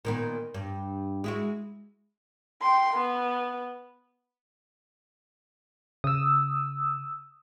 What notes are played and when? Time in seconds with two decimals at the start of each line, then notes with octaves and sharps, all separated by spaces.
0.05 A#2 D#3 B3
0.54 G2
1.24 G#3 E4 F#4
2.62 G5 C6
2.94 B3
6.04 C#3 D#6 E6